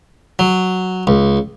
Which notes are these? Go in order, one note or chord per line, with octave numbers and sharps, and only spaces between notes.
F#3
C#2